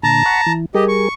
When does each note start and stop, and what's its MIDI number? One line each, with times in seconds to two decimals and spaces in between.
0.03 0.23 46
0.03 0.23 50
0.03 0.52 81
0.03 0.52 82
0.26 0.41 78
0.26 0.41 83
0.26 0.41 85
0.47 0.66 52
0.75 1.09 55
0.75 0.84 67
0.75 1.09 68
0.75 1.09 70
0.75 0.84 75
0.88 1.14 85